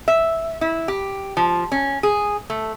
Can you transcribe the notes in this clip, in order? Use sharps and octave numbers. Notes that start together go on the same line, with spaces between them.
E5
E4
G4
F3
C#4
G#4
A3